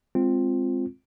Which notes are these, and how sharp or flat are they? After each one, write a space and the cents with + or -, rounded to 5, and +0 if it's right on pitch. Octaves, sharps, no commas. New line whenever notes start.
G#3 +0 C4 +0 F4 +0